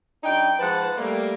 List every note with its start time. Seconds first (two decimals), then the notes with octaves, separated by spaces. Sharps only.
0.24 F#2 D4 D#4 G5
0.59 G#2 F3 B4 F#5 A5
0.97 G3 A3 A#3